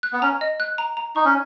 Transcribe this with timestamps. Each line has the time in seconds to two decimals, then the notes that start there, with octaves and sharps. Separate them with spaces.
0.03 F#6
0.13 B3
0.22 C#4 A#5
0.41 D#5
0.60 F#6
0.78 A#5
0.97 A#5
1.16 D#4 C#6
1.25 C#4